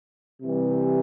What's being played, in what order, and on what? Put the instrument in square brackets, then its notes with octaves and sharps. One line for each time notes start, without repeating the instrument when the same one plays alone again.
[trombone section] C3 E3 G3